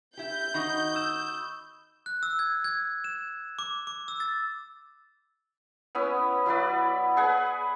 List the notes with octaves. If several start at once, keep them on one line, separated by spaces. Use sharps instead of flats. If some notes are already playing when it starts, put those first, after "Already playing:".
E4 G4 G6
D#3 D#4 F#4 B5 C#6 D#6
D#6 E6 E7
F#6
E6
G#6
G#6
E7
D6
D6
E6
A6
B3 C#4 E4
F#3 E4 B4 D5
G#4 B4 F#5 G#5